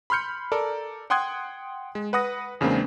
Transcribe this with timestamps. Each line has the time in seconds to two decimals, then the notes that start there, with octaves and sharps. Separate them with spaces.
0.10 B5 C6 F6 G6 C#7
0.52 A4 A#4 D5
1.10 F#5 G5 C6 D#6 F#6 G#6
1.95 G#3
2.13 B4 F#5 D#6 A#6
2.61 E2 C#3 G#3 A#3 C4 D4